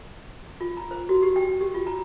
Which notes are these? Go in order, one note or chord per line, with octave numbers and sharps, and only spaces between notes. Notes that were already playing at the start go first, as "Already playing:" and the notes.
F4
A#5
C5
F#4
G4
G5
G4
F4
A#5